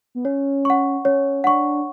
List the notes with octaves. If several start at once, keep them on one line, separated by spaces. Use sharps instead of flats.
B3
C#4 C#5
F#5 C#6
C#4 C#5
D4 F#5 C#6